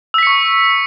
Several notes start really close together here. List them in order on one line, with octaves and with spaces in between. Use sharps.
E6 B6 C#7 C#6